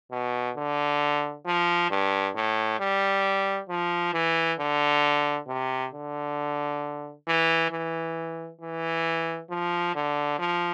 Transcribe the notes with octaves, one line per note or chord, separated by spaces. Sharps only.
B2
D3
F3
G2
A2
G3
F3
E3
D3
C3
D3
E3
E3
E3
F3
D3
F3